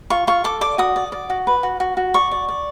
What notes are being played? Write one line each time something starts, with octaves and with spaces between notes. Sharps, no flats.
F4 C#6
F4 C#6
A4 D6
D5 D6
F#4 D#6
D5
D5
F#4
B4
F#4
F#4
F#4
D5 C#6
D5
D5